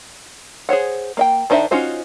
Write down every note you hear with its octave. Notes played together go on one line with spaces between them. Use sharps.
G#4 C5 C#5 F#5
A#3 D#5 G5
D#3 D4 D#4 C5 E5
C#4 D#4 F4 F#4 C5